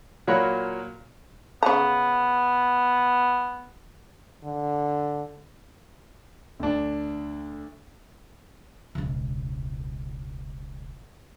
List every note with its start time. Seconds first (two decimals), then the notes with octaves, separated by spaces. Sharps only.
0.27 A#2 F#3 A#3 C#5 B5 F#6
1.63 C#3 B3 A#5
4.44 D3
6.60 D2 D4
8.95 E1 C#2